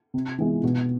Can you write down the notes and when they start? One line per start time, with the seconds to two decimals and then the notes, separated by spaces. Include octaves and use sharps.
0.14 C3
0.38 E3 G#3 B3
0.64 B2